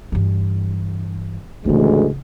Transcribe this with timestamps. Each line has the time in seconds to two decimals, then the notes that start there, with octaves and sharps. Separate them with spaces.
0.12 G2 E3
1.65 A1 D2 C#3 E3 G#3